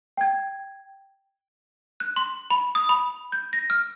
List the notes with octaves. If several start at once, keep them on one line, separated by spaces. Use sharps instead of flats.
G5 G#6
F#6
C6
B5
D#6
B5
G6
A#6
F6